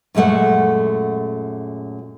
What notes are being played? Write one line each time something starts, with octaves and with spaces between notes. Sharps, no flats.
F#2 A#2 G#3 A3 F#5